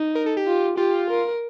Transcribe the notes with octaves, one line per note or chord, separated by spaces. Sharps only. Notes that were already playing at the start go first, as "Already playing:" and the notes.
Already playing: D#4
A#4
A4
G4
F4
F4 G4
A#4